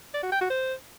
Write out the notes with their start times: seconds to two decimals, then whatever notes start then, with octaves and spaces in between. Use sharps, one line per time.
0.14 D5
0.23 F#4
0.32 G5
0.41 F#4
0.50 C5